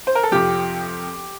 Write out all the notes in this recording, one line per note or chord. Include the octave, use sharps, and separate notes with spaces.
C5
A#4
A4
F2 C3 F3 G4